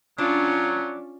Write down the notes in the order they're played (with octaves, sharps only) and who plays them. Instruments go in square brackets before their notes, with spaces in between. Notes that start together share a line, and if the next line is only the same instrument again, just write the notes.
[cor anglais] F#3 [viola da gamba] C#4 F4 [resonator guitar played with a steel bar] D4